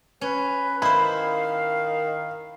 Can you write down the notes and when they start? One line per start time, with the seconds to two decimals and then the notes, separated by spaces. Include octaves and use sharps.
0.21 C#4 B4
0.82 D#3 E4 C5 F5 B5